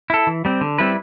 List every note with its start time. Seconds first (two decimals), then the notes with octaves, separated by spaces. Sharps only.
0.10 E4 A4
0.27 E3
0.45 G3 C4
0.61 D3
0.78 G3 C4 E4 B4